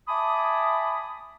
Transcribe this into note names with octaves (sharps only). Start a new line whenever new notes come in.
E5 G#5 A5 B5 D6 D#6